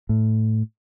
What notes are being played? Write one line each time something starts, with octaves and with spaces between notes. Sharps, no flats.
A2